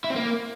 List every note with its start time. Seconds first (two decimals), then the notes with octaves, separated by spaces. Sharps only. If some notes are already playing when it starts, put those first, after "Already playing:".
0.04 E4
0.10 C4
0.16 A#3